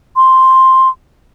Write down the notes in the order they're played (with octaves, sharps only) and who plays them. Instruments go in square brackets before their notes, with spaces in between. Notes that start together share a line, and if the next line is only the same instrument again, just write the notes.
[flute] C6